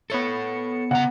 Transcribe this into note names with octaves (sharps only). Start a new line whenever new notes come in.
B3 A4 C#5 C#7
C#3 F#5 A#5